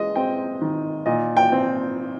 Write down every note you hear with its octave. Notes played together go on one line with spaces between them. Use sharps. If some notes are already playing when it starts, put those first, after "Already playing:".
Already playing: G#3 D#5
C4 G5
D#3
A#2 D#5
G5
C4